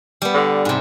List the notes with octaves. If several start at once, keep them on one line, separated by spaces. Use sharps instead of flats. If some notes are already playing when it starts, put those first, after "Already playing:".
G3 B3
D3
G#2 C3